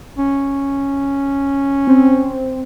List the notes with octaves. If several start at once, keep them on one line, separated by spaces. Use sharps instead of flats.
C#4
C4